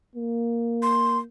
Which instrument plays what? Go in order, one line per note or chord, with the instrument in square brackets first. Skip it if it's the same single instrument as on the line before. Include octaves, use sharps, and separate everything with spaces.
[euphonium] A#3
[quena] C6